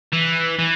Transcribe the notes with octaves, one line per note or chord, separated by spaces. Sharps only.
E3
E3